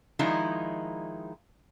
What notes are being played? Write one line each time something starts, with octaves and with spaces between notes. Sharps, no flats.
D#3 F3 G#3 D#4 E4